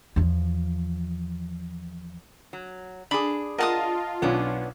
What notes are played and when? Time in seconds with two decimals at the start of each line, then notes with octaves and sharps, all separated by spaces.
0.16 E2 F3
2.53 F#3
3.11 D4 G#4 B5
3.58 F4 A#4 D#5 F#5 A5 D#6
4.22 B1 B3 C#4 D4